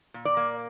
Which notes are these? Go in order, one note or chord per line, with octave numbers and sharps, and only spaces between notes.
A#2
D5
A#3